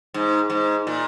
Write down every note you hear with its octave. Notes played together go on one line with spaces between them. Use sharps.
G#2
G#2
A#2